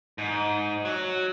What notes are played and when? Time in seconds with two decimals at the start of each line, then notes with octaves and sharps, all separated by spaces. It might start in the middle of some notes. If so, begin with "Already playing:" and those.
0.18 G#2
0.85 F#3